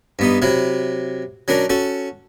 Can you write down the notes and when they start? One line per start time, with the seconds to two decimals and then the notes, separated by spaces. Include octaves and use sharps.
0.19 G2 B3 D#4
0.42 C3 F#3 E4
1.48 F#3 C#4 D4 A#4
1.70 C#4 F#4 A4